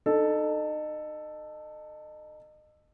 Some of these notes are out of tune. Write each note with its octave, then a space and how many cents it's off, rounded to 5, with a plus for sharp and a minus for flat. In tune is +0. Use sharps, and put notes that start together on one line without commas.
D#4 -30 A4 +0